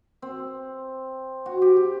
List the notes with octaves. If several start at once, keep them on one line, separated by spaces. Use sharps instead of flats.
C4
F#4
G4
G4